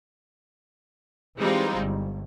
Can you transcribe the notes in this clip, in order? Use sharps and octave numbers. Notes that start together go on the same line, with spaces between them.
E3 G3 G#3 C4 D#4 F4
G1